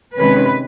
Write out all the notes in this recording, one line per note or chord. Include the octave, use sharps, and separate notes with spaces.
C3 D#3 G#3 C#4 B4